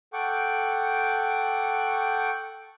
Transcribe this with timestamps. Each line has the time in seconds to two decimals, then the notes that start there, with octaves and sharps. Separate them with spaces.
0.13 A4 F#5 G5 C#6 D6